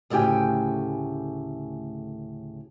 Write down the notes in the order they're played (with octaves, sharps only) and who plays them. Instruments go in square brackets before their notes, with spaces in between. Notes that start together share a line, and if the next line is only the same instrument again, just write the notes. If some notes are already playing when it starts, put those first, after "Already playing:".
[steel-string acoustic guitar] D2 A2 C#3 G4 G5 G#5